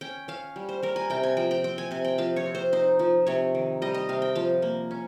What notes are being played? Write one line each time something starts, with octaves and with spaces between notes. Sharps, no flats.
C#4 G5
C#4 F5
G3
C5
G3 A#4
G#5
C3 G5
G#5
F3 G5
G5
C4 G5
G#5
C3 G#5
G5
F3 F5
C#5
C4
C5
D#4 C5
F3
C3 C#5
D#3
G3 D#5
D#5
C3 F5
G5
F3 F5
A#3
C#4